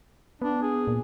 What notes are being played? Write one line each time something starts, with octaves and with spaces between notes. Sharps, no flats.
B3 D4
G#4
A#2